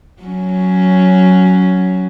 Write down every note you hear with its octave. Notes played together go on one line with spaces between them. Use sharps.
F#3 C#4